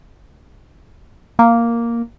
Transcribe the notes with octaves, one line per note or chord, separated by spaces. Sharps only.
A#3